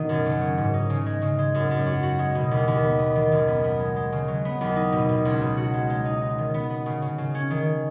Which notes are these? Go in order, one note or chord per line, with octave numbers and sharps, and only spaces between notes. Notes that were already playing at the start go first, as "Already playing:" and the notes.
Already playing: B2 D#3 B3 D#4
F#2
C#3
C#4
G#2
D#4
C#3
G#3
C#3
G#3
F#2
F#2
F#4
F#4
G#3
B2
D#2
D#2
B3
B3
D#3
F#2
B3
B3
G#3
G#3
C#3
F#3
B3
D#2
D#4
B2
B2
C#2
B2
F#4
G#3
G#3
D#4
D#4
D#3
B3
B3
C#3
C#3
C#3
C#4
D#3